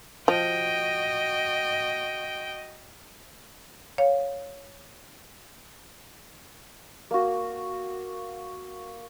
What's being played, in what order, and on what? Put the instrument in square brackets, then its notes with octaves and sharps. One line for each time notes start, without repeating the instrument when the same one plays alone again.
[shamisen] F3 [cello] F#4 D#5 [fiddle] G5
[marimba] C#5 F5
[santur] A#3 F#4